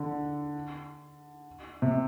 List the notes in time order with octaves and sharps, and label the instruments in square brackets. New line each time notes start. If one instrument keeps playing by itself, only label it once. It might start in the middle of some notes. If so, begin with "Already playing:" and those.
Already playing: [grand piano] D3
C3